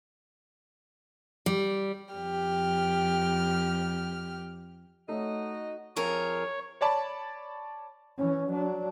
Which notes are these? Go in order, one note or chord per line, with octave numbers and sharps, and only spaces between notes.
G3
F2 G4 F6
A3 D#4 F#4 C#5 D#5
F2 G#4 A#4 C#5
C#5 D5 A5 B5
E3 C#4
F#3 D4